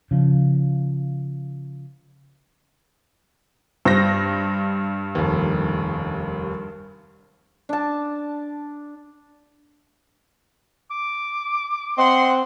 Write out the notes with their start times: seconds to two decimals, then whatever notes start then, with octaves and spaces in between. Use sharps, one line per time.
0.11 C#3 F3
3.85 G2 C5 A#6
5.15 F1 D#2
7.69 D4 A5
10.91 D6
11.98 C4 D#5 F#5 C6